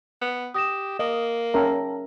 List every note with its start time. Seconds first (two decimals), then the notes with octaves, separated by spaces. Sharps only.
0.21 B3
0.54 G4 D#6 A#6 E7
0.99 A#3 D#5
1.54 C#4 A#4 E5 G5 A5 A#5